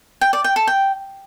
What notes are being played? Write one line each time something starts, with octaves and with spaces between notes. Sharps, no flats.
G5
D5
G5
A4
G5